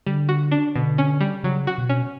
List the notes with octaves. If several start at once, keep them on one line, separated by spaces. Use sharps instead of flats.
D3 G3
F#4
D4
B2 D3
C#4
G3
C#3 F#3
F#4
B2
C#4